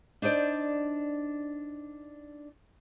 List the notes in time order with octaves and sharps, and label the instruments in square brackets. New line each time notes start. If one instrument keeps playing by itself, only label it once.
[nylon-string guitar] D4 D#4 C5 D5